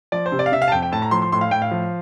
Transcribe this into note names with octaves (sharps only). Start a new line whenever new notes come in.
F3 D5
C5
C3
D5
F5
C3 E5
F5
A5
F2 G5
G5
A2 A5
A#5
F3 C6
C6
A2 C6
F5
A2 G5
F5
F3